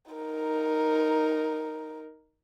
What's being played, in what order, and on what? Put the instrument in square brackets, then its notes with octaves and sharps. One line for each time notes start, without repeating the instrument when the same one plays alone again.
[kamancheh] D#4 A#4